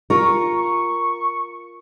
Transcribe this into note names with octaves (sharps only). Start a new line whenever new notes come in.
F4 A#4 C#6